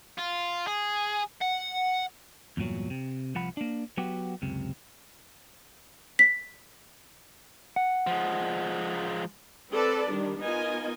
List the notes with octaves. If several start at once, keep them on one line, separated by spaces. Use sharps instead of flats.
F4
G#4
F#5
E2 G2 A#2 F#3
C3
C2 F3 F#5 B5
A#3 D4
F#3 B3 F#4 G4
C#2 F#2 C3
B6
F#5
F3 G#3
C4 A4 B4 D5
D#3 G3 D4
B3 D#4 F4 A#4 D#5 G#5